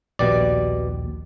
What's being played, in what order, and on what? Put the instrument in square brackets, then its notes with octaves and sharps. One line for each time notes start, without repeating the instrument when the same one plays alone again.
[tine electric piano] A#1 D#2 [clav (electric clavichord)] B2 G3 D5